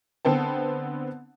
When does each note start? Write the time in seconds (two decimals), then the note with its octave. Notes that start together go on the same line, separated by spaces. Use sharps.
0.25 D3 B3 C4 A5